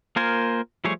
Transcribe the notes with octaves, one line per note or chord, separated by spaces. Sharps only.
A#3 F4 A#4 C5 G#5
F3 G3 A3 G#4 C#5